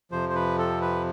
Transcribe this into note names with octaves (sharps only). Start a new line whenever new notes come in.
F2 C3 F3 C5
C5
B4
A4
B4